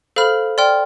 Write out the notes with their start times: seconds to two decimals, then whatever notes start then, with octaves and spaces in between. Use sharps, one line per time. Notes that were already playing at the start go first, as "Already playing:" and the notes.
0.16 A4 C5 F5 B5 F6
0.58 D5 G5 C6 F6